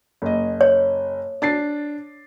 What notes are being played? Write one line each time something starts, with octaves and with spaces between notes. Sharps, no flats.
F#1 D#5
C#5
D4 A6 C7